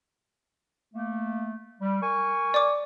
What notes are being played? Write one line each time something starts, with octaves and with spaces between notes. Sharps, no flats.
A3 A#3
G3
A#4 G#5 C#6
D5 D6